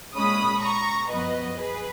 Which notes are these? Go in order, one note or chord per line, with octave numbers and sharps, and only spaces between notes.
A#2 G#3 C#4 B5 D#6
A#5 C#6
F#2 F3 B3 B4 D#5
G#4 B4